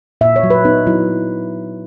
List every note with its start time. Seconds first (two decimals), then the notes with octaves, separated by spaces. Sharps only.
0.21 A#2 E5
0.36 C#5
0.43 F#3
0.50 B4
0.65 B3 D#4
0.87 F#3 E4